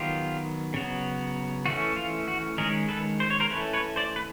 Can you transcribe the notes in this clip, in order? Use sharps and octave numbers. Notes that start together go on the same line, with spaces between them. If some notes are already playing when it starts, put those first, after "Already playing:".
Already playing: D#3 F#3 B3 F4 G4
C#3 F#3 B3
E3 A3 C#4 F#4
F4
F#4
D#3 G#3 C#4 G#4 A#4
A4 B4
C5
C#5
A#4 C5
E3 A3 C#4 B4 C#5
B4 C#5
C5 D5
B4